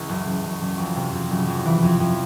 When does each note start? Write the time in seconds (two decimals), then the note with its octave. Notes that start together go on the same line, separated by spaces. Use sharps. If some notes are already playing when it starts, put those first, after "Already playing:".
Already playing: C#2 E3
0.09 F#1
0.26 F#1
0.44 F#1
0.61 F#1
0.78 F2
0.96 C3
1.13 F2
1.31 F#1
1.47 F2
1.65 E3
1.82 F2
2.00 F2